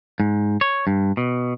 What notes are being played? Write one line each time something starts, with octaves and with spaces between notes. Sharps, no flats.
G#2
C#5
G2
B2